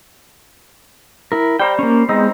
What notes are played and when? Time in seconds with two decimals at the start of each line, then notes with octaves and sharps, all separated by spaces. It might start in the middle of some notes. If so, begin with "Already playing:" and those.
1.32 E4 A#4
1.59 G3 C5 G5 A#5
1.79 A#3 C#4
2.09 G#3 B3 C4 D#4